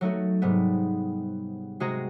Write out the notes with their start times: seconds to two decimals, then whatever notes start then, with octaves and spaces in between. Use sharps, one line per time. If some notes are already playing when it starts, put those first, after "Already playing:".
0.01 F#3 A3 D#4 F#4
0.42 G#2 C3 G3 B3
1.80 C3 G#3 F#4 G#4 A#5